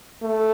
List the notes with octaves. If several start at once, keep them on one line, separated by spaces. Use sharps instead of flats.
A3